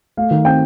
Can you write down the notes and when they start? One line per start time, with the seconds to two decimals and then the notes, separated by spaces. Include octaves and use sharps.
0.17 A3 F5
0.31 D#3
0.45 C4 G5